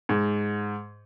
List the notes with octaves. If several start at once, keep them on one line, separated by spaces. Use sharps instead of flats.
G#2